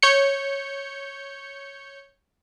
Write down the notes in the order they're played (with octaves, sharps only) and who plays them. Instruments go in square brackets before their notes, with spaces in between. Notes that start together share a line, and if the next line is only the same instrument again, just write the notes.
[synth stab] C#5 G6 C#7